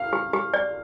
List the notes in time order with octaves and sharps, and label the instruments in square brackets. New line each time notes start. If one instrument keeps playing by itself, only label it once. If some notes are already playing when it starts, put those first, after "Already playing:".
Already playing: [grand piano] F5 F6
[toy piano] G4
G4
D5